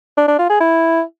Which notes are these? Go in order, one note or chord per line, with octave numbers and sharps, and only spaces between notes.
D4
D4
F4
G#4
E4